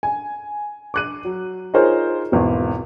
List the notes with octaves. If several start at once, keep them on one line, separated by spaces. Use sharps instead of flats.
G#5
D6 F#6 D#7
F#3
D#4 F4 G#4 A#4 C5 C#5
G#1 E2 B2